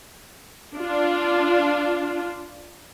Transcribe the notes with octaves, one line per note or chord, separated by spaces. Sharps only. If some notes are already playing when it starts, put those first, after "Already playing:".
D4 F4